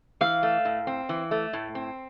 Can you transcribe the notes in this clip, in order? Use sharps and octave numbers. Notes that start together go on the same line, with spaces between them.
E3 F5
A3
A2
C4
E3
A3
A2
C4